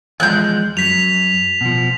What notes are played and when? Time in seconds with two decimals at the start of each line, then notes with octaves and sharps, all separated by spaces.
0.20 E2 F3 G#3 F#6 G6
0.77 F#2 F#3 B6 F7
1.61 B2 F3